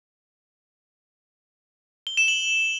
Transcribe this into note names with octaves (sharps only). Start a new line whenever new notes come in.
G7
E7
F#7